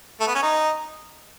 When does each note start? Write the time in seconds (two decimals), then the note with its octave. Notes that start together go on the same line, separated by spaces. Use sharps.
0.20 A3
0.27 B3
0.35 C#4
0.42 D#4